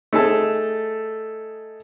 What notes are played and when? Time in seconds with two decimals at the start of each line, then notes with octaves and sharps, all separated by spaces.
0.13 A3 D#4 G#4 A4 A5